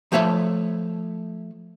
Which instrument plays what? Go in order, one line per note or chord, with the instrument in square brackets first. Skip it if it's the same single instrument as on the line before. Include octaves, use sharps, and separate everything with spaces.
[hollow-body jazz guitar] F3 A3 C#5 E5 A5